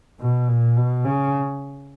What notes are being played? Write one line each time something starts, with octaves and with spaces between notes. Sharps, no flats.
B2
A#2
B2
C#3